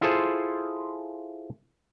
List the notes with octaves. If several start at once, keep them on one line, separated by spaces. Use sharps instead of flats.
E4 F4 G#4 A4 C5